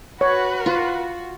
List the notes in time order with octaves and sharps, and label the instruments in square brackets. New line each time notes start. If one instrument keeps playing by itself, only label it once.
[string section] F#4 [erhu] B4 [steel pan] C#5
[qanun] F4